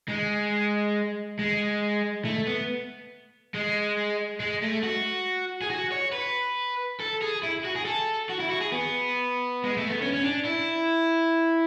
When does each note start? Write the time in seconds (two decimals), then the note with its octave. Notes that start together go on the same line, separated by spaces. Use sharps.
0.09 G#3
1.39 G#3
2.25 A3
2.47 B3
3.54 G#3
4.40 G#3
4.63 A3
4.83 F#4
5.61 G#4
5.70 F#4
5.92 C#5
6.13 B4
7.00 A4
7.22 G#4
7.43 E4
7.65 F#4
7.76 G#4
7.85 A4
8.30 F#4
8.40 E4
8.50 F#4
8.61 G#4
8.72 B3
9.64 G#3
9.77 A3
9.89 B3
10.01 C#4
10.13 C#4
10.24 D4
10.45 E4